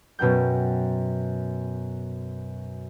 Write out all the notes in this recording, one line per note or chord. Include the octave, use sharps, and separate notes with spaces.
F#2 B2 C#4 G5 G6